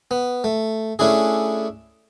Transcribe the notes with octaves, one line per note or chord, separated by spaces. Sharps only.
B3
A3
A3 C#4 D4 E4 G#4